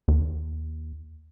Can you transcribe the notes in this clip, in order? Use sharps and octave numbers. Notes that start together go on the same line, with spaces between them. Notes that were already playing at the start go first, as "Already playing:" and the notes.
D#2